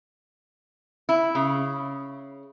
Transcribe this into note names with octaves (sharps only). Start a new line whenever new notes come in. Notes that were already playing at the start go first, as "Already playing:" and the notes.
E4
C#3